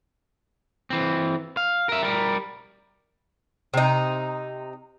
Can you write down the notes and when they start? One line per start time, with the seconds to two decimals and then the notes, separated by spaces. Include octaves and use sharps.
0.90 E3 C4
1.57 F5
1.89 A#4 E5
2.03 G3 A#4
3.74 C3 D#4